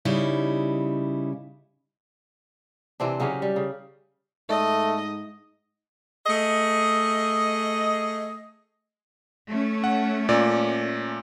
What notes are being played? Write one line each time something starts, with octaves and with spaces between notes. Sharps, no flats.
C#3 G3 D#4 E4
C3 E3 C4 D4
C#3 F#3 C#4 G4
G3
C#3
G#2 A3 D#5
A3 G#4 D#5
A3 C#4
F#5
A#2 D5